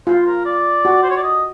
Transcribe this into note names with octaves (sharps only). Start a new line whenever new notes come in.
F4 C5
A#4
D5
F#4
C5
C#5
D5
D#5